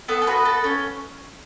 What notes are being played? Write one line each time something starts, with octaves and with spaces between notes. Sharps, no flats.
B3 A4
A4
F#4 B4
A4
C#4